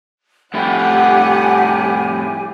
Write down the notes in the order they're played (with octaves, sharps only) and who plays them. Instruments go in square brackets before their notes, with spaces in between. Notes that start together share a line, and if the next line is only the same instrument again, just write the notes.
[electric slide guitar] F2 A2 E4 [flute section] G4 G#5 [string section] F#5